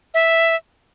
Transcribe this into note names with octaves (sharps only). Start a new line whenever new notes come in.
E5